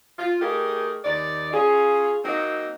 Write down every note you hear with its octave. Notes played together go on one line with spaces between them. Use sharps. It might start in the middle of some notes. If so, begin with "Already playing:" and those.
F4
A3 D#4 G4 G#4 A#4
D#2 D#4 D5
C#4 F4 G#4
F#3 A#3 C4 D#4